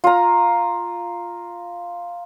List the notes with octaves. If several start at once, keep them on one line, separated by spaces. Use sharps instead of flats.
F4 A#5